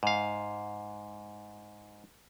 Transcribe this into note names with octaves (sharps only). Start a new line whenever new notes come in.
G#2 F5